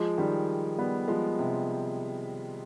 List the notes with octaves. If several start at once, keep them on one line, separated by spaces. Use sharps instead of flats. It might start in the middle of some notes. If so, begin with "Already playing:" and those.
Already playing: F3 G#3
D#3 G3
G3 B3
F3 G#3
C3